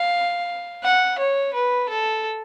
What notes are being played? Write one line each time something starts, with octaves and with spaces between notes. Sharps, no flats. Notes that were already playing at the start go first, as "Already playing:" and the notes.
Already playing: F5
F#5
C#5
B4
A4